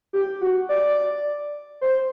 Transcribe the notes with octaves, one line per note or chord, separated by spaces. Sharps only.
G4
F#4
D5
C5